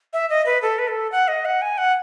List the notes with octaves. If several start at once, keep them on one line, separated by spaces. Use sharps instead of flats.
E5
D#5
B4
A4
B4
A4
F#5
D#5
F#5
G#5
F#5